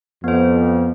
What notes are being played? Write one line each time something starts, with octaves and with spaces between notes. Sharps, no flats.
F2 B3 C5